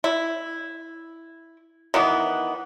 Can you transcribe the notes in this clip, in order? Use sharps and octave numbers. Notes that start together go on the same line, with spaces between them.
E4
D#3 E3 B3